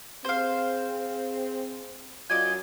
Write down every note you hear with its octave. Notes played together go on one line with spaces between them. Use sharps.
C4 G#4 C5 F5
F#2 F#3 F4 D5 D#5 G#5